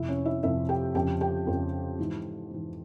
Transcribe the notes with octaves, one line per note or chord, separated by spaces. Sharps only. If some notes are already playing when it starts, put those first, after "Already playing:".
Already playing: F2 C3 F3 E4 E5
C#4 C#5
E4 E5
F2 C3 F3 E4 E5
G4 G5
F2 C#3 F3 G4 G5
G4 G5
F2 C#3 F3
G#2 E3
G#2 E3